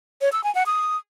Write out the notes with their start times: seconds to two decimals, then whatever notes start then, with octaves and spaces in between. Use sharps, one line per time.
0.21 C#5
0.32 E6
0.44 G#5
0.55 F#5
0.66 D#6